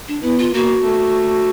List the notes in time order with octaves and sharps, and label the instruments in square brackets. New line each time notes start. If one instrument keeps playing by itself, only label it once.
[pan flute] D4
[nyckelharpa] B3 [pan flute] E4
[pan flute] F4
[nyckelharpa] A#3 [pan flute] F#4
[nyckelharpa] A3